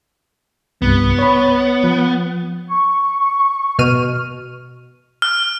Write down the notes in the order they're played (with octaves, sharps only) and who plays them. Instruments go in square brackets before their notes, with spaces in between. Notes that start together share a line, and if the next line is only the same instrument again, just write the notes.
[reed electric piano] C2 G2 [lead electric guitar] B3
[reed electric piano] C#5 B5
F3
[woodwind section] C#6
[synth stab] B2 F6 D#7
[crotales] F6